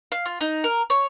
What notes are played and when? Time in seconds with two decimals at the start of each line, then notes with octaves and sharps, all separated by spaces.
0.12 F5
0.26 F4
0.41 D#4
0.64 A#4
0.90 C#5